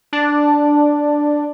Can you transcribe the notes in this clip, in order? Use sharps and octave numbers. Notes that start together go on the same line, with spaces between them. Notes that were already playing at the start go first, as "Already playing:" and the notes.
D4